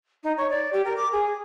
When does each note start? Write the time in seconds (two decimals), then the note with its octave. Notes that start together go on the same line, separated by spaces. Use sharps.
0.24 D#4
0.38 C#5
0.50 D5
0.73 G4
0.85 A#4
0.97 D6
1.12 G#4